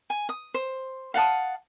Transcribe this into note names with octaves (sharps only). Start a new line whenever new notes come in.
G#5
D#6
C5
F5 F#5 A5 D#6